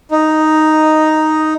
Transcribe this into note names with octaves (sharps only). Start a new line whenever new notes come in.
D#4